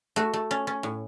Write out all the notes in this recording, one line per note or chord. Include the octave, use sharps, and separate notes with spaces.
A3 F#4
A3
C#4
C#4
A2